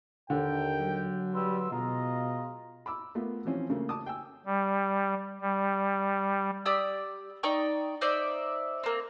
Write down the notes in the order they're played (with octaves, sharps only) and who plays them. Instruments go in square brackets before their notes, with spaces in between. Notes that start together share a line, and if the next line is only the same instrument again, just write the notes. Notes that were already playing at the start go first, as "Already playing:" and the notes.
[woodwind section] D#2 [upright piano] D3 [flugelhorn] G5
[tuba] F#3
[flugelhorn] G3 [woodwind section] B4 C6 E6
[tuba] B2 [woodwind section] G#3 F4 A#5 [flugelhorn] D#5
[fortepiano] B5 D6 E6
A3 B3 F4 A#4
E3 F3 C4 C#4
C#3 A3 A#3
A5 D6 D#6
G5 G#5 E6
[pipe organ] G3
G3
[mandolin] G4 D5 D#6 E6
D#4 D5 G5 C#6
D#4 C5 D5 E5
A#3 C4